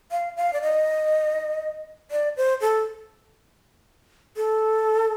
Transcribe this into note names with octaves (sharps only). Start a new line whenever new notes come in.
F5
F5
D5
D#5
D5
C5
A4
A4